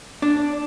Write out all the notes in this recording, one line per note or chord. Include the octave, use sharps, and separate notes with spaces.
D4